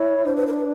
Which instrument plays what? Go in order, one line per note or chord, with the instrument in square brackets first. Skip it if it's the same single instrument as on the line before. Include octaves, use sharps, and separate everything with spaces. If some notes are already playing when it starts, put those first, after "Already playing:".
Already playing: [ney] E4 [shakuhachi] C#5
[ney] D4 [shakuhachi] C5
[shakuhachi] B4
A#4
C5
B4